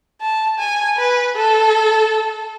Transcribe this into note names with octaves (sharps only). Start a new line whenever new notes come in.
A5
G#5
B4
A4